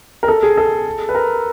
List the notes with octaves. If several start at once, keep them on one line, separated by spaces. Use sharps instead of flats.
A#4
A4
G#4
A4
B4
A#4